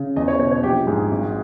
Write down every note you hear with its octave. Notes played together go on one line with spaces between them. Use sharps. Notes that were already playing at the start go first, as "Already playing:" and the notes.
Already playing: C#3
E2 D#5
C#5
B2 C#5
C#5
A#1 G4
G#2 G#4
G#1